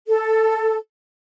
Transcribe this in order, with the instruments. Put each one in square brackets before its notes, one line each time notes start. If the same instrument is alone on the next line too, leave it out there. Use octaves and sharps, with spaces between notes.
[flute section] A4